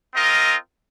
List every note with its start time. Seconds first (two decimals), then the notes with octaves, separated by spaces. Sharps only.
0.14 C4 F4 A#4 D#5